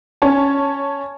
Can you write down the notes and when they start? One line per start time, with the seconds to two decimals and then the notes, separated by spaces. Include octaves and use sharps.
0.22 C#4 C#5 A5